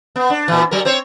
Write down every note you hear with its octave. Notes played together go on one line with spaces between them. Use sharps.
B3
D4
A#2 E3
F#3 A#4
C4 C5 C#5